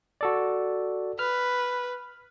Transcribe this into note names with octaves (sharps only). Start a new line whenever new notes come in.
F#4 A4 D5
B4 F6